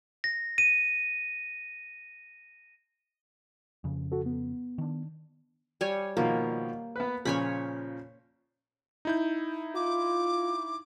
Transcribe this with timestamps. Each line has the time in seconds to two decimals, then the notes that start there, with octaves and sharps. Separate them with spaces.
0.24 A#6
0.58 D#7
3.84 F2 C#3
4.12 F#4 A4
4.26 B3
4.78 D#3 D4
5.81 G3 C#5 G#5
6.17 B2 D#3 F3 A#3
6.96 B3 B4
7.25 A#2 C#3 F3 C#5 G#5 B5
9.05 D#4 E4 G6
9.75 F4 D6